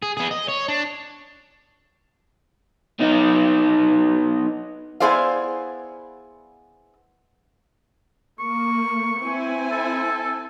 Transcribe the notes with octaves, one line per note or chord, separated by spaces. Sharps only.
G#4
B3 G#4
D#5
C#5
D4
B3 D#4
B3 E4 G#4 C5 D5 F5
A#3 C#6
C4 E4 G#5
A4